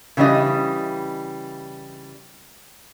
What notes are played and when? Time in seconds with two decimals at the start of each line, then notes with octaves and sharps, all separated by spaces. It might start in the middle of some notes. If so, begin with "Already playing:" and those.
0.17 C#3 E3 G3 D4 D#5